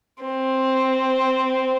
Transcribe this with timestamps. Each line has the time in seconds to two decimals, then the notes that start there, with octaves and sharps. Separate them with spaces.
0.24 C4